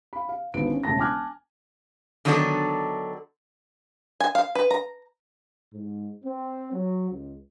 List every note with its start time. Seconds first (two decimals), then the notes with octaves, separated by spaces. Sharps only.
0.13 F5 B5
0.29 F5
0.54 G#1 D#2 D3 B3 D7
0.71 C#4
0.84 E1 C#3 A3 A5 A#6
0.99 G#5 A5 D6 F6 F#6 G#6
2.25 D3 D#3 F#3 B3 D4 A4
4.20 G#5
4.35 F5
4.55 B4
4.71 A#5
5.73 G#2
6.24 C4
6.73 F#3
7.10 C#2